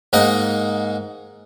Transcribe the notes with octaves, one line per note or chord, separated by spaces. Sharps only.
G#2 A#3 D#4 D#5 F#5